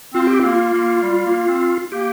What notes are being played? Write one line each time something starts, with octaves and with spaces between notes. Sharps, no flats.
C4 F4
G4
A#3 F4
A#3
G3
A#3
C4
A#3 G4